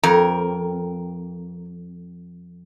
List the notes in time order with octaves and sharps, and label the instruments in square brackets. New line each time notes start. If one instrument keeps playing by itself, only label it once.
[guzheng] F2 [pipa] A#4